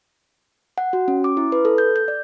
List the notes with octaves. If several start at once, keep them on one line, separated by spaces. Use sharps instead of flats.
F#5
F#4
C#4
D6
E4
B4
A4
G6
G6
D5